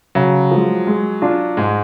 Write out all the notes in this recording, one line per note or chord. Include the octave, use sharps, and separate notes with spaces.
C#3 F#3
F3 G#3
G#3
D4 F4
G#2 G#3